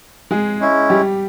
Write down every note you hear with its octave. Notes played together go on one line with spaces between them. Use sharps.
G#3 G#4
G#3 C#4 E4
G3 G4